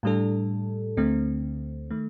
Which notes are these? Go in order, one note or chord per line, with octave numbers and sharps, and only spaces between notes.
A2 G3 D4 A4
D2 D3 A3 C4
D#3 A3